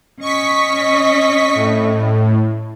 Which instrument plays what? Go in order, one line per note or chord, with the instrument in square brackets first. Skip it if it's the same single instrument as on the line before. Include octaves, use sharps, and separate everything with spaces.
[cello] C#4 D#5 [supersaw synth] C#6 B6
[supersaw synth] A2